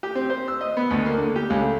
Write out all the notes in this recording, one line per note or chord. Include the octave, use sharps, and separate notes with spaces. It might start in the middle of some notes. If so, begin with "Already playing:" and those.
G4
C4
C5
E6
D#5
B3
D2
A#3
D3
G4
C#2
A3